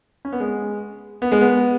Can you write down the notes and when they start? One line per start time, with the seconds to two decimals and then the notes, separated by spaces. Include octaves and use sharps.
0.25 C#4
0.32 B3
0.40 G#3
1.22 B3
1.32 G#3
1.41 B3